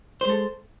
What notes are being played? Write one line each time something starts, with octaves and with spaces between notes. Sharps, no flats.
G#3 A4 C5